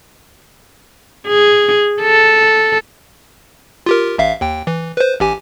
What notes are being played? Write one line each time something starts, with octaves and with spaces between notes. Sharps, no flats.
G#4
A4
F4 G4 A#4
A1 E5 F5
D#2 G5
E3
B4 C5
A1 G4 G#5